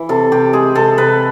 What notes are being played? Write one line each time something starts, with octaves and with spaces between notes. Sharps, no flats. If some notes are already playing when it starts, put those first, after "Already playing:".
Already playing: E3
C3 A4
C3 G4
G#3 G#4
C3 A4
C3 B4